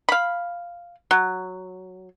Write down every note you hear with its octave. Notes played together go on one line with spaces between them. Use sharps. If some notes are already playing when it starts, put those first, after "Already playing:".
F5 B5
F#3